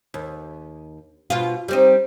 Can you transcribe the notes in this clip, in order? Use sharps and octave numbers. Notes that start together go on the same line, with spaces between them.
D#2
B2 F4
G3 C4 D#4